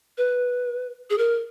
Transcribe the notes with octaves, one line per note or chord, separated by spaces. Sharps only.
B4
G#4
A#4